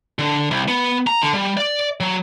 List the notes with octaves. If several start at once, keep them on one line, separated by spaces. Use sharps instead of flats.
D3
C2
B3
A#5
D3
G3
D5
F#3